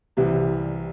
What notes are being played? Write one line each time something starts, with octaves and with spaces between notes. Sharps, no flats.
C2 C3 E3 G3